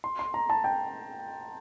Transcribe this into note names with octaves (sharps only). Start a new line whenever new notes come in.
C6
C6
A#5
A5
G5